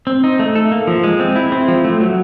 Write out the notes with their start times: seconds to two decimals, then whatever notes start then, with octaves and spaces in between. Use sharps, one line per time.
0.07 C4
0.24 D#4
0.39 A3
0.55 A4
0.71 A#3
0.87 F3
1.04 G#3
1.20 C4
1.36 E4
1.52 C4
1.68 F3
1.84 A3
2.00 F#3